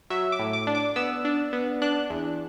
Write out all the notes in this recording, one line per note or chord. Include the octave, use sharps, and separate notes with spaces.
F#3 E5
D6
A2
D6
D4
D6
B3 E6
D4
B3
D4 F#6
E2